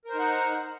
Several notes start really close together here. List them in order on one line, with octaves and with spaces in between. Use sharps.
A#4 C5 D#4 F#5